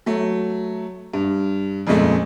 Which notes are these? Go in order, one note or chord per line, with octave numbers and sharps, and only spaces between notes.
F#3 A3
G2
F2 A#2 C#3 G#3 A3